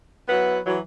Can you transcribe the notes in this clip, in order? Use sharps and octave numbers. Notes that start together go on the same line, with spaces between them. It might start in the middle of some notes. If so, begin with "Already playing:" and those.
F#3 B3 E4 B4 F#5
E3 F#3